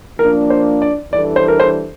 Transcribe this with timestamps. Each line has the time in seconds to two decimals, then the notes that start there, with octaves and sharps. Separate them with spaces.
0.19 F3 A#3 D4 A#4
0.50 C5
0.82 D5
1.13 E3 G3 D4 A4 D5
1.36 C5
1.48 A#4
1.60 C5